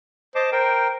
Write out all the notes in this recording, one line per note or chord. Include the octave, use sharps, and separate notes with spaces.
C5 D#5 A5 D6
A#4 C5 G5